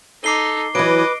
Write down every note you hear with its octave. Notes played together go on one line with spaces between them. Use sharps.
D#4 A4 D6 C7 G7
E3 F#3 B4 D#5 D6 D7